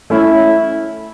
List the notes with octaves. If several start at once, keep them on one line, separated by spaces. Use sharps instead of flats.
A3 C#4 E4